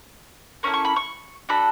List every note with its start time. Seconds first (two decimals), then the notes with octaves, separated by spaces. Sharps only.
0.63 A#3 C#4 E4 A4 C#6
0.74 C#6
0.85 B5
0.96 C#6
1.49 D4 F#4 A4 B5